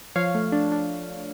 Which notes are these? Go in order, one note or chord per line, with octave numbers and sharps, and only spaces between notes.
F3 C#5 F5
A3
D4
D4